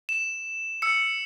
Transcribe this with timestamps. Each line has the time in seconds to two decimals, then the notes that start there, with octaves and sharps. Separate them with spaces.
0.09 E7
0.82 E6 C#7